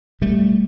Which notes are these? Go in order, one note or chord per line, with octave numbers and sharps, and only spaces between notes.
B2 G3 A3